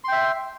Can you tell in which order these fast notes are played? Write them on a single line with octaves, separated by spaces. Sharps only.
C6 G5 E5